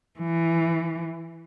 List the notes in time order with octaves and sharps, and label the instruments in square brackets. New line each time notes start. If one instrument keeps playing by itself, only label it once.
[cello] E3